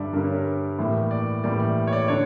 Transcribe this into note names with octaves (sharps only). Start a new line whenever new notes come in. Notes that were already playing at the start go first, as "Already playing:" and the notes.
Already playing: G2 D3 G3 D5 E5
G2 D3 G3 A#4
C#5
A#4
A2 E3 G3 A#3
D5
A2 E3 G3 A#3 D5
D5
C#5
D5
D3 C#5